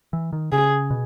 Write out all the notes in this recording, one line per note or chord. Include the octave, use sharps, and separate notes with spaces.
E3
D#3
C#3 G#4
B2